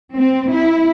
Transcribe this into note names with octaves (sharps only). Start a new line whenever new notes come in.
C4
E4